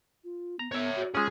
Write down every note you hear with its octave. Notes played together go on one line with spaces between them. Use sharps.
F4
B3 A#5
B3 C#5 E5
F#4
G#3 C#4 F4 G#4